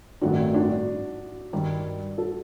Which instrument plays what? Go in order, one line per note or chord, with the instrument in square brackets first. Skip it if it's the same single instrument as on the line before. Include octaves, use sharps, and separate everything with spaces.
[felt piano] A1 G2 D#3 A3 C4 [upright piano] D4 F#4
[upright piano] D4 F#4
[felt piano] G2 D#3 G3
[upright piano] F#4 A4